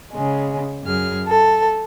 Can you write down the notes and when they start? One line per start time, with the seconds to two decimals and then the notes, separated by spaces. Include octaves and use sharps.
0.12 C#3 G#3
0.84 F#2 G#4 F6
1.27 A4